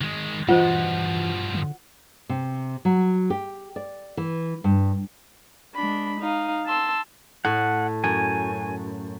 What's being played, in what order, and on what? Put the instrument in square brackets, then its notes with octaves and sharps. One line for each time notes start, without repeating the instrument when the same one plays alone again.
[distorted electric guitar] D#3 G#3
[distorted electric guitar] G2 F3 [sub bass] E3 [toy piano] F4 C5 D#5 [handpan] F#5
[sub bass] D3
[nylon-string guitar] C3
F#3
G4
D5
E3
G2
[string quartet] G#3 D4 B5
D#4 F5
A5 C6 E6
[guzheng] A2 [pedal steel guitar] F#5
[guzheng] F#2 [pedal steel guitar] G#5